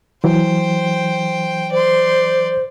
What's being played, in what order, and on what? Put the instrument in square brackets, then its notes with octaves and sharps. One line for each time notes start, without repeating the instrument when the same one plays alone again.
[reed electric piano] E3 F#3 [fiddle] C5 G5
[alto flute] C5 [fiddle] D5 C6